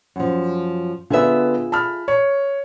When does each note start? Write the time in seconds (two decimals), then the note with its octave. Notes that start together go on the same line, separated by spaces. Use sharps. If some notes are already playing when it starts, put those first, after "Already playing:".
0.16 F#2 F3
1.10 D3 B3 F4 G#4 E5
1.72 A5 B5 F6
2.08 C#5